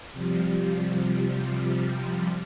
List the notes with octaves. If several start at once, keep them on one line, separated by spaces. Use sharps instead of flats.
C3 F3 G3